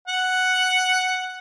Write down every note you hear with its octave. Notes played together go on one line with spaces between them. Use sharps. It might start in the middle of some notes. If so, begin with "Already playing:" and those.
F#5